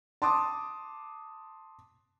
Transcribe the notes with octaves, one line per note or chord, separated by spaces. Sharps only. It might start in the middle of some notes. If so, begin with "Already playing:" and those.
A5 C6 D6 D#6